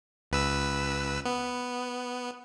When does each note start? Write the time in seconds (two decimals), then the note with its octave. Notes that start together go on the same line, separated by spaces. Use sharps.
0.32 C#2 B4 E6
1.26 B3